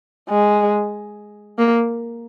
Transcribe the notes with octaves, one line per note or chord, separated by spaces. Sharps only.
G#3
A#3